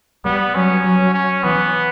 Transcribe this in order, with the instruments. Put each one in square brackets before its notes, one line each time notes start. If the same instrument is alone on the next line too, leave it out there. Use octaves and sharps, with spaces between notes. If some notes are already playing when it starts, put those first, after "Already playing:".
[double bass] G3 [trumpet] B3
[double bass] F#3 [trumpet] C#4
[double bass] F#3
[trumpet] C#4
[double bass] E3 [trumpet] B3